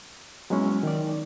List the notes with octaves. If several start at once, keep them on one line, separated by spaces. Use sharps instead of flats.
F#3 G#3 B3 C#4 E4
D#3 D5